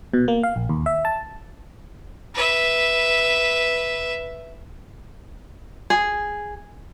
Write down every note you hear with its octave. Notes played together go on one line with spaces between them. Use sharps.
B2
A#3
F5
A#1
D#2
E5
A5
B4 E5
G#4